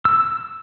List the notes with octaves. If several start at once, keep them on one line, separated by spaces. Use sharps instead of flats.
E6